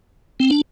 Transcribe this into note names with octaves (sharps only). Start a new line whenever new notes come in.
C4
D4